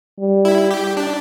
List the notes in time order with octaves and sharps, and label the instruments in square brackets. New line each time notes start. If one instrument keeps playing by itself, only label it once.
[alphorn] G3
[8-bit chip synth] E4
G4
D4